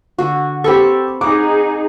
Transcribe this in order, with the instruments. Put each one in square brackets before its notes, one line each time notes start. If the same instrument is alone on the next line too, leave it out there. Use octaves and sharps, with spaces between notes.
[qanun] D3 F#4
[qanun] C4 B5 C#6 [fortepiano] G4 A4
[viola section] D#4 G#4 [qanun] F#5 [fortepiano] D6